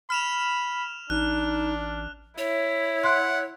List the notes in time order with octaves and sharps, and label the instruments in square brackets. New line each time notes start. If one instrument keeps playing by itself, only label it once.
[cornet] B5 [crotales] F6 E7 F7
[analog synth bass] A1 [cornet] D4 [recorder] D#4 [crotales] F#6
[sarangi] E4 [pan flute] C#5
[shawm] F#5 [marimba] C6 F#6